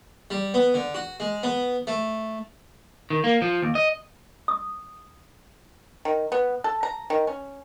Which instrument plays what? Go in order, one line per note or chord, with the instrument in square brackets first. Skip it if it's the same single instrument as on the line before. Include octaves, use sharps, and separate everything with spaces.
[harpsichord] G3
B3
D3
F#4
G#3
B3
A3
[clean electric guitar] D#3
A#3
F3
D#2
D#5
[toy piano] D#6
[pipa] D#3
B3
A4
A#5
D#3
C#4